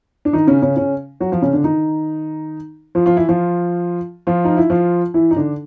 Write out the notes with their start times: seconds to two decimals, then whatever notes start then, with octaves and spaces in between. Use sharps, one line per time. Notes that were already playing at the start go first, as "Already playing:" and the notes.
0.25 D4
0.33 D#3 D#4
0.47 C#3 C#4
0.62 C#3 C#4
0.76 C#3 C#4
1.20 F#3 F#4
1.32 F3 F4
1.42 C#3 C#4
1.53 D3 D4
1.64 D#3 D#4
2.95 F3 F4
3.06 F3 F4
3.17 E3 E4
3.29 F3 F4
4.27 F3 F4
4.45 D#4
4.57 E4
4.70 F3 F4
5.14 E3 E4
5.31 D#4
5.36 D3 D4